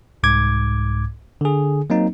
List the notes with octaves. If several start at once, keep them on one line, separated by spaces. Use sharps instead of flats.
C2 G#2 D6 G#6
D3 G#4
F#3 A#3 C4 D#4